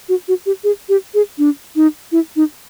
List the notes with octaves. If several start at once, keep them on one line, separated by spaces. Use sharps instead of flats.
F#4
F#4
G4
G#4
G4
G#4
D4
D#4
E4
D#4